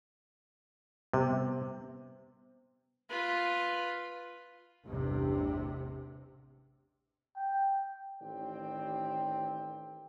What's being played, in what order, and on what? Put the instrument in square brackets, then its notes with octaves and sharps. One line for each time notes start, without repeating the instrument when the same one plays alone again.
[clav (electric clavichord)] C3 [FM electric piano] G3 B3 C5
[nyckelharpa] F4 B4
[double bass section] A1 E2 C3 [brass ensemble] G2
[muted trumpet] G5
[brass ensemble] A1 D#3 C4 D5 G5